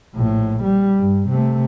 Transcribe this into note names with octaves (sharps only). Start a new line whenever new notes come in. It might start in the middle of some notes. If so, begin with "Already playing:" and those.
A#1 A2
G3
G2
C3 A3